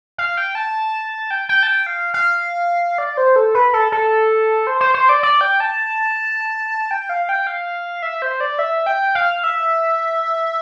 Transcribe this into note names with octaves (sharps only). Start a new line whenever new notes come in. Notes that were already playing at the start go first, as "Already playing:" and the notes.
F5
G5
A5
G5
G5
A5
G5
F5
F5
D5
C5
A4
B4
A4
A4
C5
C5
C5
D5
D5
G5
A5
G5
F5
G5
F5
E5
C5
D5
E5
G5
F5
E5